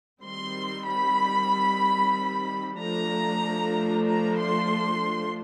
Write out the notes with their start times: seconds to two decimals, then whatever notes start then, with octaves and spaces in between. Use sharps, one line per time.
0.22 D#3 G3 C4 C6
0.86 B5
2.78 F3 A3 D4 A#5
4.06 A#5
4.39 C6